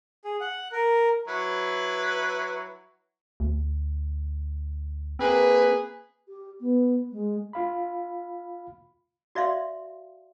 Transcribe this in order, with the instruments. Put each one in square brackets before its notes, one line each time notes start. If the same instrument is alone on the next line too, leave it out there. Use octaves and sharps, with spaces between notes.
[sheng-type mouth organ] G#4
F#5
A#4
[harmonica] F#3 E4 B4
[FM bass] D2
[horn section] A#3 G#4 B4 [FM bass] C4
[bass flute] G4
B3
G#3
[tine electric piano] F4 F5 B5
[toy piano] F#4 D5 E5 F5 C6